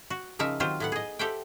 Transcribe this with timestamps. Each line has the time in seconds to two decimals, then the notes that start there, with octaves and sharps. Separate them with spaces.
0.10 F#4
0.39 C#3 F3 D#4 A#4 E5
0.60 D#3 F#3 C4 F4 G4 C5
0.80 A2 B3 F#5
0.92 G#4 D#5
1.19 G4 A4 C5 E5 F#5 G5